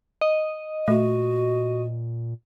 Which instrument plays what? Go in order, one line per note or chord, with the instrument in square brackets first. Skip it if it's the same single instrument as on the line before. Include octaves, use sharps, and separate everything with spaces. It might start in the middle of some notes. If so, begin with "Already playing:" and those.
[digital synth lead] D#5
[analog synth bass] A#2 [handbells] A3 [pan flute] F#4